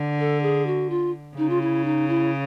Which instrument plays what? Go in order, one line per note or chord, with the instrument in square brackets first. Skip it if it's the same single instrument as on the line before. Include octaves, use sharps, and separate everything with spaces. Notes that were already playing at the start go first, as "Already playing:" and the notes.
Already playing: [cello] D3
[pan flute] A4
G#4
F#4
F4
[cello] C#3 [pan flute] D#4
[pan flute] F4
E4
D#4
E4